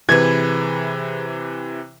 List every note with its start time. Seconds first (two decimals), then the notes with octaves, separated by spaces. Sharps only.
0.09 C3 E3 G#4 B4 G#6